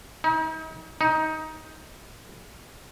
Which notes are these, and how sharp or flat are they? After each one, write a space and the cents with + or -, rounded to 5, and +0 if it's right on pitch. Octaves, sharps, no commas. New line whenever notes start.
D#4 +40
D#4 +15